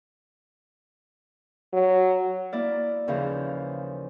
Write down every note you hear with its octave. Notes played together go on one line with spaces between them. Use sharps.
F#3
A#3 E4 D5 F6
D#2 C#3 E3 F3 F4 C5